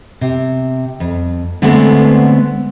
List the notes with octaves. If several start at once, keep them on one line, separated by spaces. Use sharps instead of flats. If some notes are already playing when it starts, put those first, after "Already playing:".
C3
F2
D3 G#3 A3 B3 C4